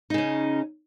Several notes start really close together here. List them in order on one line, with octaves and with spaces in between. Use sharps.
D#4 C#3 C#4